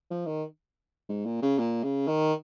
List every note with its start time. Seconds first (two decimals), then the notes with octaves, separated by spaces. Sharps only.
0.11 F3
0.26 D#3
1.09 G#2
1.26 A#2
1.42 C#3
1.59 A#2
1.83 C#3
2.08 D#3